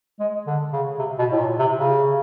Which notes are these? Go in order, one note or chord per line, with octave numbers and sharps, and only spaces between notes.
G#3
D3
C#3
C3
B2
A2
A#2
C3
C#3